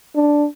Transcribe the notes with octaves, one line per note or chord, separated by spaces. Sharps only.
D4